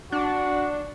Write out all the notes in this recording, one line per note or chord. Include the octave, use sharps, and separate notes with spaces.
D4 F#4